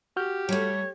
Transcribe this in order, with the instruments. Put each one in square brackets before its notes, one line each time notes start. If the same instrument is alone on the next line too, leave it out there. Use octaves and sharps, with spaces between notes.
[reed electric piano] F#4 F6 G6 [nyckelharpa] G4
[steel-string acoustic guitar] G3 A3 [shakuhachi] C#5